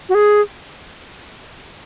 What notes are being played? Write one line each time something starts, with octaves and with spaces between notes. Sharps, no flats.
F#4
G#4